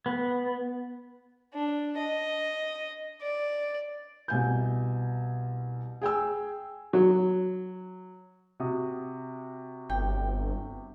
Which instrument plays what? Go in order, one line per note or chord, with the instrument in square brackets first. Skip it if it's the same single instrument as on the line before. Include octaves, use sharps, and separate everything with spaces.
[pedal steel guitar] B3
[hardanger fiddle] D4
D#5
D5
[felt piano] C2 B2 G#5 G6
G#4 G5 G#5 E6
[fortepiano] F#3
[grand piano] C3 F#4 D#6
[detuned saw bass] G1 [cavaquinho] G5